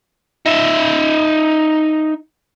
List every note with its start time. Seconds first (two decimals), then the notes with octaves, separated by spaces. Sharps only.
0.46 D#4 E5